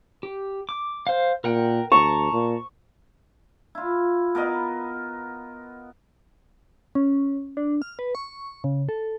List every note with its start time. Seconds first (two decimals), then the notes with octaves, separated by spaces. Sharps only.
0.23 G4
0.69 D6
1.07 C5 F5
1.44 A#2 A#4 F#5 G5
1.92 D2 A5 A#5 C#6
2.33 A#2
3.75 E4 F4
4.35 B3 A#4 B4 D#5
6.95 C#4
7.57 D4
7.82 F6
7.99 B4
8.15 C#6
8.64 C#3
8.89 A4